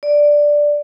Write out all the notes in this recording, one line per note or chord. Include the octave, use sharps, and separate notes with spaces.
D5